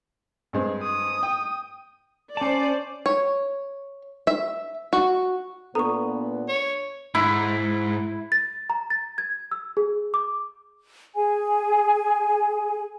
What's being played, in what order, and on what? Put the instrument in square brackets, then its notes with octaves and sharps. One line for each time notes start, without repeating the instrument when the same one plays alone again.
[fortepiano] G2 G#3 C4
[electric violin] D#6
[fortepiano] G5
[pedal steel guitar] C#4 A5 [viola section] C5 D5
[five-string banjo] C#5
E5
F#4
[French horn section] A#2 B3 D4 [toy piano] A4 [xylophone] A#5 C#6
[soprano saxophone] C#5
[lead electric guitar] G#2 [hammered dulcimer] E4
[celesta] A6
A#5
A6
G#6
E6
G#4
D6
[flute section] G#4 G#5